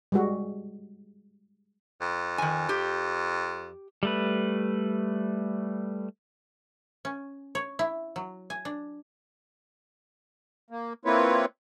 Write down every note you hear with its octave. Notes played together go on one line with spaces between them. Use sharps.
G3 G#3 F#4
F2
D#3 G#5
G4
G3 A3 B4
C#4
C#5
E4
F#3
G#5
D4
A#3
A#3 C4 E4 F4 B4 C#5